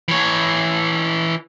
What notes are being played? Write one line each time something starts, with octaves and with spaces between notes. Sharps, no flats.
E3 C#5